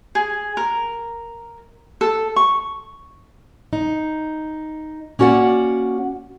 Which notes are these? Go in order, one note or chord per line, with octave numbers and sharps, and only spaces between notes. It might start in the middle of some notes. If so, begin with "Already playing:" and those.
G#4
A#4
A4
C#6
D#4
A#3 C#4 F#4 D5 F#5